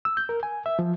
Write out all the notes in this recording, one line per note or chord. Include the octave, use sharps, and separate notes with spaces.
E6
G6
A#4
G#5
E5
F3